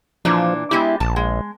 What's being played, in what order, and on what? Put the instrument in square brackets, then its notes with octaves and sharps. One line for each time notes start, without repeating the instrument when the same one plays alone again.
[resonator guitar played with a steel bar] A#2 E3 D4 [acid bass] F3
[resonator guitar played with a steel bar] G#3 B3 G4 [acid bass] E4
[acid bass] A#1 [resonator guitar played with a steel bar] A5
[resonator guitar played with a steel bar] G#3